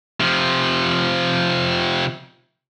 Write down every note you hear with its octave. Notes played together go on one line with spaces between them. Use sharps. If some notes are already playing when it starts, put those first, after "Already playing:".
C3 F3